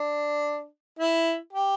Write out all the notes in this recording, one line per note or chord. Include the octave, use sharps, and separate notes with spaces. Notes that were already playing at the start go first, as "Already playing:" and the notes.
Already playing: D4
E4
G4